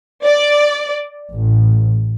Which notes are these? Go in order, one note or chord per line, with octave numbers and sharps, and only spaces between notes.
D5
A1